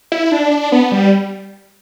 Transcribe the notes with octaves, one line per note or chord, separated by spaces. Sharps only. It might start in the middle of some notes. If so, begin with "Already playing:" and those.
E4
D4
D4
B3
G3